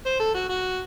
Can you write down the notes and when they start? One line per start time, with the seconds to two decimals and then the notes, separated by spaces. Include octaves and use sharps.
0.06 C5
0.20 A4
0.34 F#4
0.49 F#4